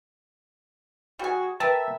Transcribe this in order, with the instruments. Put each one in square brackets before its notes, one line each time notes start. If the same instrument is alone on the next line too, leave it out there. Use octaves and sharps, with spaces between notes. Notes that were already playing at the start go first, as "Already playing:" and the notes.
[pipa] G3 G#5 [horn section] F#4 G#4
[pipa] A#4 B4 [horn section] E5 [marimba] G5 [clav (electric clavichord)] A5